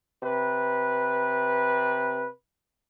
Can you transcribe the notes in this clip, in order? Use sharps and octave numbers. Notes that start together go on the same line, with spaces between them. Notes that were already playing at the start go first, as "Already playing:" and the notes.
C3 B4